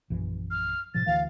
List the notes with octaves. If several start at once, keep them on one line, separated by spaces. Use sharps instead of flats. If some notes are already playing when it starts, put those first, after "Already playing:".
A#1 F#2 E3
F6
A2 C3 F3 A6
D2 E3 F5